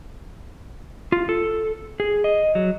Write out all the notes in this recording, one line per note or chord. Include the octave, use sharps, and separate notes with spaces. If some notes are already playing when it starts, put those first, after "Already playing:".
F4
A4
G#4
D#5
F#3